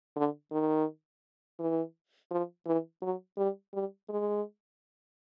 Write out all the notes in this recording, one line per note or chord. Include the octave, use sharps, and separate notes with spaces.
D3
D#3
E3
F3
E3
F#3
G3
G3
G#3